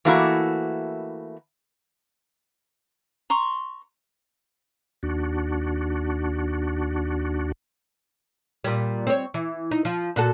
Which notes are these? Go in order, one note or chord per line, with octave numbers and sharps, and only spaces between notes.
E3 A3 A#3 E4 F#4
A#5 C6 C#6
D#2 D4 F#4
A#2 G3
C4 C#5
E3
D#4
F3
A#2 F#4 A4